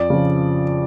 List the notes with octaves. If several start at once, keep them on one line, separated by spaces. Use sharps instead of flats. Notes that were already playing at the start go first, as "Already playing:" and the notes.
Already playing: F2 D5
C#3 F3